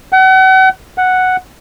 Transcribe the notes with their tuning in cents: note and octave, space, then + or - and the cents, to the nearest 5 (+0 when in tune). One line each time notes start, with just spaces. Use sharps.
F#5 +40
F#5 +0